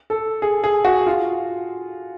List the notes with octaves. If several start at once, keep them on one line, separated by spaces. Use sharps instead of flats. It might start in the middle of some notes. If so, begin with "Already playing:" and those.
A4
G#4
G#4
F#4
F4